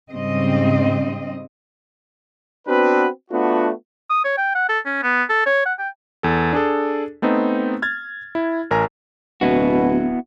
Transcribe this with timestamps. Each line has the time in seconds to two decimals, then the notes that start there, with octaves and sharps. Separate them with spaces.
0.11 G#2 C#3 G3 C4 D#5
2.68 B3 C4 D4 F#4 B4
3.31 A3 B3 D4 F4 F#4
4.10 D#6
4.25 C#5
4.38 G5
4.55 F#5
4.69 A4
4.86 C#4
5.03 B3
5.30 A4
5.46 C#5
5.66 F#5
5.79 G5
6.23 E2 A4
6.53 D4 G#4 A4
7.22 A3 B3 C4 D#4
7.82 F6 G#6 A6
8.35 E4
8.71 A1 A#4 G#5 A#5
9.41 D1 B2 B3 E4 F#4